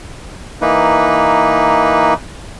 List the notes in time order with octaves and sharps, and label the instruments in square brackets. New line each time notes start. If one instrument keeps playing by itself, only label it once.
[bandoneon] E3 A#3 D#4 B4